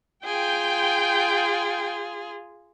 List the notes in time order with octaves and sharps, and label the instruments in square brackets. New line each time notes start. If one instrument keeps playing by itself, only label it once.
[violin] F4 G#4 [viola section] G5